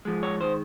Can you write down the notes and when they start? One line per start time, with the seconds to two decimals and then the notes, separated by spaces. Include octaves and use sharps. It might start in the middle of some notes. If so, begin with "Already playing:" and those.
0.05 G#2 F3 G#3
0.23 C#5
0.41 D#3 G#3 C5